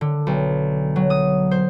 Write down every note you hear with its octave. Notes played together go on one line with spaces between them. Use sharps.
D3
B1
F#3
D#6
C5